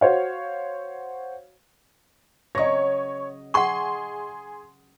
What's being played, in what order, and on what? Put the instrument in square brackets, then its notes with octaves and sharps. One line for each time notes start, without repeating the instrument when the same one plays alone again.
[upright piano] F#4 C5 C#5 F5
[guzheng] C#3 F#3 [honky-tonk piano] C#5 C#6 [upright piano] D#5 A#6
[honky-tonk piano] G#4 C6 [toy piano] F#5 C#6